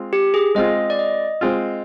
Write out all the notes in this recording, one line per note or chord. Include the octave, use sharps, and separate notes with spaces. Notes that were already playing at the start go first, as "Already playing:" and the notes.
Already playing: G#3 C4 F4
G4
G#4
G#3 C4 F4 D#5
D5
D#5
G#3 C4 F4